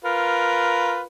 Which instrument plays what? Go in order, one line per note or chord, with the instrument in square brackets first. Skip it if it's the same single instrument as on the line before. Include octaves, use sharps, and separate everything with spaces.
[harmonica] F4 A#4 B4